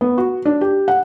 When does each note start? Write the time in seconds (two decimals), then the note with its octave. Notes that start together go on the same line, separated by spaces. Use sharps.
0.01 B3
0.18 F#4
0.45 D4
0.61 G4
0.88 F#5